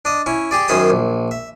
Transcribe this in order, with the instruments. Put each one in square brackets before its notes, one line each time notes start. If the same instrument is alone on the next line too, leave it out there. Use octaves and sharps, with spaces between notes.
[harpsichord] D4 D#5
C#4 E4
G4 G#4 D5
F#2 D#3 G#4 C5 B5 D#6
A#1
E5